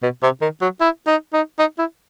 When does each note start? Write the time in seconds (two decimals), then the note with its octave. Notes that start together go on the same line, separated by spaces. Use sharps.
0.02 B2
0.23 C3
0.42 D#3
0.62 F#3
0.81 E4
1.07 D#4
1.34 D#4
1.59 D#4
1.79 E4